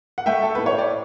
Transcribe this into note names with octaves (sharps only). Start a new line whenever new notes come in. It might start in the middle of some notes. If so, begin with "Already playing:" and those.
F#5
A3 E5 G5
A4
A2 B4
C#5
D5